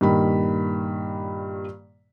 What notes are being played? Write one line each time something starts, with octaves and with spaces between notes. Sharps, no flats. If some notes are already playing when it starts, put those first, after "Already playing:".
G2 A#2 D#3 B5